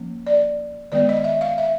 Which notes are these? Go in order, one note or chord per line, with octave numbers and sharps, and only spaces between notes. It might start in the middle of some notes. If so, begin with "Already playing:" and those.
Already playing: F3 A#3 C#4
D5
D#3 G#3 B3 D5
D#5
E5
F5
E5